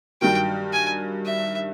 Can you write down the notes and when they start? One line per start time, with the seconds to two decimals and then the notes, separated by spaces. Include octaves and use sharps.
0.21 G2 D#3 F#3 G5
0.72 G#5
1.25 E5